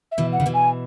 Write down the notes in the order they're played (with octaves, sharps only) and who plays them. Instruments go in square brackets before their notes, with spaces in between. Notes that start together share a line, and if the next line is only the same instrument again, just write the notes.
[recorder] E5
[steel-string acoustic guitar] B2 E3
[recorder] F#5
[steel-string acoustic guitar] C#3
B2 E3
[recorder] G#5